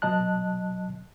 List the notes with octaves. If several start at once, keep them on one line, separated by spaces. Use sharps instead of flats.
B2 F#3 D#5 A5 F#6